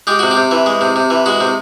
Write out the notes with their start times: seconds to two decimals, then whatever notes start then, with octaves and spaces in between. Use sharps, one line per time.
0.07 G#3 G4
0.19 C3 F#4
0.31 G4
0.37 C3
0.51 E3
0.66 G#3
0.81 C3
0.96 C3
1.10 E3
1.26 G#3 F#4
1.41 C3